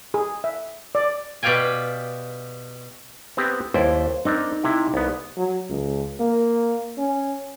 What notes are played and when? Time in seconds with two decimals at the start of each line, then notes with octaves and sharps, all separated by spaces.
0.14 G#4
0.44 E5
0.95 D5
1.43 B2 G4 D5 F5 G5 G#5
3.37 B3 C4 G4
3.74 D#2 E4 C5 D5
4.25 C4 D4 D#4 A#4
4.64 C3 E4
4.94 C2 B3
5.37 F#3
5.69 C#2
6.20 A#3
6.98 C#4